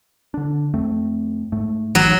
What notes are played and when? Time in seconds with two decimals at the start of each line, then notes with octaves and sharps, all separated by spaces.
0.34 D3 D4
0.74 F2 A3 C4
1.52 G#2 A3
1.95 D1 A1 E3 F#3